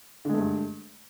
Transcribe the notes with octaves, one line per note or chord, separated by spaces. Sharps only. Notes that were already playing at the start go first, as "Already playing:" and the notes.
G2 D3 G#3 A3